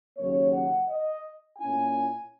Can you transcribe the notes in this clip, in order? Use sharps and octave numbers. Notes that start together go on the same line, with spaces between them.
D#2 C#3 F#3 A#3 C#4 C#5
F#5
D#5
A#2 A#3 C#4 E4 G#5